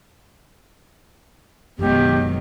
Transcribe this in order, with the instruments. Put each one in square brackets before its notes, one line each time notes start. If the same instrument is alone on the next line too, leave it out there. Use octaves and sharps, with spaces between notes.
[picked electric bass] F#1 G#3 [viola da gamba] B2 D#3 F#3 [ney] G4